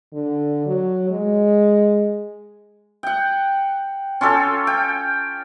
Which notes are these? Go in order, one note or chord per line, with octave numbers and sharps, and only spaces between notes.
D3
F#3
G#3
F#5 G5
C#4 F4 G4 A4
G5